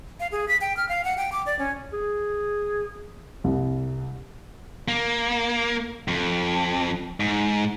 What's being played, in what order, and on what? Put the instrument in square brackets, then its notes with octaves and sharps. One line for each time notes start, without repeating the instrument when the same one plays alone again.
[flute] F5
G#4
B6
G5
F6
F5
F#5
G5
D6
D5
C#4
[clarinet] G#4
[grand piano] C2
[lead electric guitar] A#3
F2
G#2